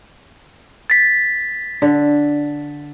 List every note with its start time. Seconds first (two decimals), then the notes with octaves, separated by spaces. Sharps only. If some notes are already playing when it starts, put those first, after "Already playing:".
0.90 A6 B6
1.82 D3